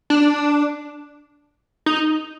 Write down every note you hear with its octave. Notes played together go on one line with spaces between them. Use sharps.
D4
D#4